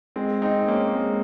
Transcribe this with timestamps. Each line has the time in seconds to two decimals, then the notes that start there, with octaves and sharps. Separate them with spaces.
0.16 G#3 C4
0.42 C4 D#4
0.68 A#3 C#4
0.95 G#3 C4